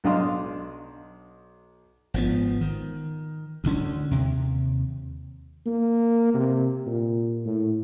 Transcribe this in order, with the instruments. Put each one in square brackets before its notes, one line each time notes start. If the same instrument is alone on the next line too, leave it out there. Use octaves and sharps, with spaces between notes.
[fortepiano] B1 D4 D#5 F5 C6
[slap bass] G#1 F3 B3
D#3
D2 D3 C#4
D#2 C3
[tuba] A#3
C3
A#2
A2